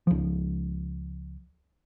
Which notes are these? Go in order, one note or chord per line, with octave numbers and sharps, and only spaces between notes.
C#2 F3